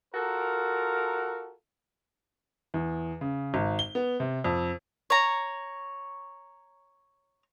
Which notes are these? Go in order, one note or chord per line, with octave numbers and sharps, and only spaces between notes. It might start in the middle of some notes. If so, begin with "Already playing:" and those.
F4 F#4 A4 A#4
E2
C#3
G#1
G7
B3
C3
F2
C#5 A#5